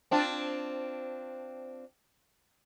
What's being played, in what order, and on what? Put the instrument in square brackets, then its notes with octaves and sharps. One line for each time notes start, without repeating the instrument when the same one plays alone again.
[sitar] C4 D4 F4